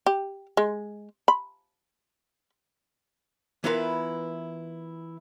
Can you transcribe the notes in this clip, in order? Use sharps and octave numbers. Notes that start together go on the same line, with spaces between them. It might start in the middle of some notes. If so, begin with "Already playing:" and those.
G4
G#3
B5
E3 B3 E4 F4 A#4 B4